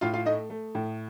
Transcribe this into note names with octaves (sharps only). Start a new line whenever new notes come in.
A2 F4 F5
F4 F5
A3 D#4 D#5
A3
A2